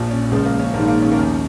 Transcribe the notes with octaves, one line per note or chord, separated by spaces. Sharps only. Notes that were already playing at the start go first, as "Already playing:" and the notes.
Already playing: A#1 A#2 F3
C#4
C#2 C#3 F3 G#3
A#3
C#4
A#1 G#2 D#3 A#3
A#3
C#4
A#3
D#2 D#3 C#4